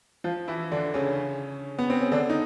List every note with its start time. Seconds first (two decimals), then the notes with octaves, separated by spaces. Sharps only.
0.24 F3 F4
0.48 E3 E4
0.71 D3 D4
0.94 C#3 C#4
1.78 B3
1.90 C4
2.01 C#4
2.12 D3 D4
2.30 D#4